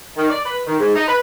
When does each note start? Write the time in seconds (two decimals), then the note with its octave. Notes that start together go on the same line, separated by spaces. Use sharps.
0.16 D#3
0.30 D5
0.45 B4
0.66 D#3
0.79 G#2
0.95 D#4
1.08 B4